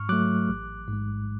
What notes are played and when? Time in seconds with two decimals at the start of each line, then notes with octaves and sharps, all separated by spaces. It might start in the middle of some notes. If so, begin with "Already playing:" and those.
Already playing: G#2 C#6 F6
0.09 F#3 A3 D6 F#6
0.49 A1
0.88 G#2 G#3